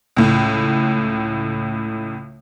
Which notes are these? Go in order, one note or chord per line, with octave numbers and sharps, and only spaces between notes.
C#2 A2